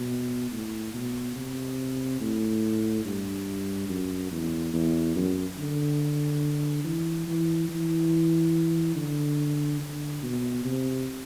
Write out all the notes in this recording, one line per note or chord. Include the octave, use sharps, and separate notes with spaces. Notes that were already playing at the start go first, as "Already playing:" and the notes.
Already playing: B2
A2
B2
C3
A2
G2
F#2
E2
E2
F#2
D3
E3
E3
E3
D3
D3
B2
C3